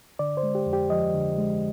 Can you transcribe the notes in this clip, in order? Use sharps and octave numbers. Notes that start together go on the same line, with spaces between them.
D3 D5
C5
G#3
G4
F2
G4
F3 D#5
D3
G#3